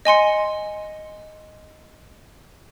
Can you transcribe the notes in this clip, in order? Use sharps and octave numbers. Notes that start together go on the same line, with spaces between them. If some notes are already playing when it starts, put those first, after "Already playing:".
D#5 G#5 C6 C#7